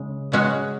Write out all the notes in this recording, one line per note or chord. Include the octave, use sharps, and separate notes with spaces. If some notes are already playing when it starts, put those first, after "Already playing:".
Already playing: C#3 G#3
C#3 G#3 C#4 F#4